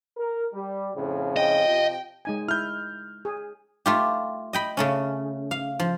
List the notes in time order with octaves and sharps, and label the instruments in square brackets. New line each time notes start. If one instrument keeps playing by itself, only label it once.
[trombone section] A#4
G3
F2 A2 C#3
[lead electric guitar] D#5 [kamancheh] G5
[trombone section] C3 F3
[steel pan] G#3 D#4 G#5
[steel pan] E4 [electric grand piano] F6 G6
[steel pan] G#4
[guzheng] A3 F4 G4
D#5 G5 B5
C#3 A3 C#4
F5
F3